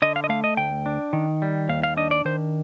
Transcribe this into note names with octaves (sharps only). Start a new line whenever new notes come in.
D3 D#5
F5
D#5
A3 F5
D#5
D2 G5
D4
D#3
G3
D#2 F5
F5
D4 D#5
D5
D#3 C5